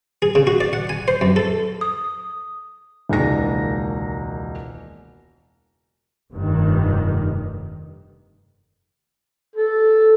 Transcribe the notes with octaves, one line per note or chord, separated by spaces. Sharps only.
G#4
C#3
F#4
D5
F#5
G#5
C5
F#2
A4
D#6
E1 C#2 D#3 A#3 A#6
F1 G2 C3 D#3
A4